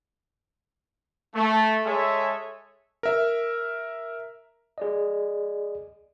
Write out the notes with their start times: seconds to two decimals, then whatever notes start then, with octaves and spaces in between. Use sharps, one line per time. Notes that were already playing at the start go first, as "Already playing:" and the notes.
1.35 A3
1.85 G#3 G#4 A4 C#5 E5
3.03 A#4 E5
4.78 G#4 D5 D#5